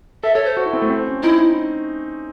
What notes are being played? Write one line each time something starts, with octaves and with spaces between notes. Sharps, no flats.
A4 E5
A4 C#5
C5
F#4
E4
C4
A3
C4
C#4
D#4 E4